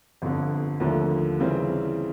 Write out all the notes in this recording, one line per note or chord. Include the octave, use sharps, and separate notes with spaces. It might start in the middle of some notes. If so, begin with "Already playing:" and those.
G1 F2 D3
D#2 D3 F3 A3
C#3 E3 G3 C4